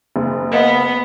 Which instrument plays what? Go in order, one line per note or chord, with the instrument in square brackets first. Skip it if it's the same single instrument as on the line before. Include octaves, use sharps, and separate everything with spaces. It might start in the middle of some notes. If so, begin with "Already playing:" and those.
[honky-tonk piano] F#1
[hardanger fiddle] B3 [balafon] A#4 D#5 F5